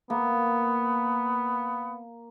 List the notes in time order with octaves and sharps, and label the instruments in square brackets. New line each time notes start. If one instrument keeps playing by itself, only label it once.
[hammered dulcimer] A#3 [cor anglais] B3